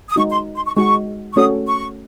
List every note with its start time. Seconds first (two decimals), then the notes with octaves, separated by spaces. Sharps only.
0.08 D#6
0.16 G#3 D#4 F#4 C#6
0.31 C6
0.56 C6
0.66 C#6
0.76 G#3 D#4 F#4 C#6
1.32 C#6
1.36 A3 C#4 F#4 A4 C#5 D#6
1.67 C#6